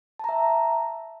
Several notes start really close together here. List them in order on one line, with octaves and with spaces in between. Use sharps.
A5 A#5 E5